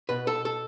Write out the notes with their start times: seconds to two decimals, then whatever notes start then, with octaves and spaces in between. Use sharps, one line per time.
0.09 B2 B4
0.27 A4
0.45 A4